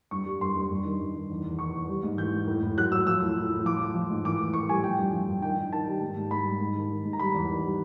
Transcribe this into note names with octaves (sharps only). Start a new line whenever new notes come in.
G2 C#6
G3
G2 C6
G2
G2
D#3
G2
D#3
E2
E2
E2 C#6
E2
G3
G#2
E3 G6
G#2
A2
A2
F#3 F#6
F#3 E6
F3 E6
A2
A2
A2
F3 D6
F3
F3
G#2
E3 D6
A2
A2 C#6
G3 G#5
F3 G5
G2
F3
G2
D#3 G5
D#3
D#3 A5
G3
G#2
G#2
G#2 B5
G3
G#2
D#3
D#3
G#2
A#5
G3 B5
E2
D#3
G3